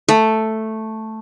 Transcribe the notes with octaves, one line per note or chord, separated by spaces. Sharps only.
A3